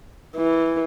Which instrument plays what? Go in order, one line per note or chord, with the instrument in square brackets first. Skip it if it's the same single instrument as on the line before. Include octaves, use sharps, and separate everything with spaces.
[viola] E3